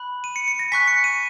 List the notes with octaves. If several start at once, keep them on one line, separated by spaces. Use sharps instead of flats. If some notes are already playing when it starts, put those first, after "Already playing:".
Already playing: B5 F#6
D#7
C#7
C#7
A#6
G#5 C#6 F#6 B6
C#7
D#7